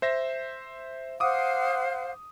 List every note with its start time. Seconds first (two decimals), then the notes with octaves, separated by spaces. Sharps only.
0.02 C5 E5 A#6
1.20 C5 F5 F#5 D6 D#6